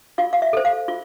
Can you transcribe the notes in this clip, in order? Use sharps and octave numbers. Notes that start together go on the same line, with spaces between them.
F4 F5
F5
E5
A4 C5
F5
F4